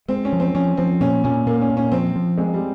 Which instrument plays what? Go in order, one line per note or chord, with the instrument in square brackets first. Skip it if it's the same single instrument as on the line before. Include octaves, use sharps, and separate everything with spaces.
[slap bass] G#3 [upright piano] C4
[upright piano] C#4
[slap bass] F3
[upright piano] C4
[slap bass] F3 [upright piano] C#4
[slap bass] F3 [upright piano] C4
[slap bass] A#2 [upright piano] C#4
[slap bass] A#2 [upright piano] C#4
[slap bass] A#2 [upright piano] A#3
[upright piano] C#4
[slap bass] A#2
[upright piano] C#4
[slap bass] F3 [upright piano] C4
[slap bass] F3
[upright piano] G#3 [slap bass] C4
[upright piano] G3